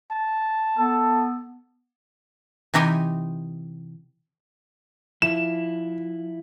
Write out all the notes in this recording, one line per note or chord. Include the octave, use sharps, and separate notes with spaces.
A5
B3 A4
C3 E3 D#4 G4 D#5 G#5
F3 E4 E7